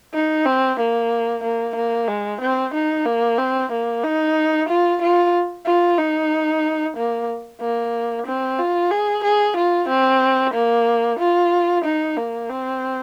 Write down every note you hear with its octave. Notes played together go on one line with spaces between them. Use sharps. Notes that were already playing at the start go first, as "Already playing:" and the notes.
D#4
C4
A#3
A#3
A#3
G#3
C4
D#4
A#3
C4
A#3
D#4
F4
F4
F4
D#4
A#3
A#3
C4
F4
G#4
G#4
F4
C4
A#3
F4
D#4
A#3
C4